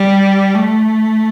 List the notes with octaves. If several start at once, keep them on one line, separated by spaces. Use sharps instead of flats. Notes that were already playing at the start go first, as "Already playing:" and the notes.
Already playing: G3
A3